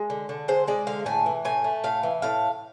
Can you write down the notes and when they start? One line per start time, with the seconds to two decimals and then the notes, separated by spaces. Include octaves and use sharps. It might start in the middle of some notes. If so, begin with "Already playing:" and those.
Already playing: G#3
0.10 D3
0.29 D3
0.48 G#3 C5
0.67 G#3 D5
0.87 D3 F5
1.06 A2 G#5
1.26 E3
1.45 A2 G#5
1.64 A3
1.84 A2 F5
2.03 E3
2.22 A2 F5